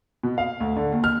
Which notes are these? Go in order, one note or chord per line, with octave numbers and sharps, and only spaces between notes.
B2
F5
D2
D3
D#2
F6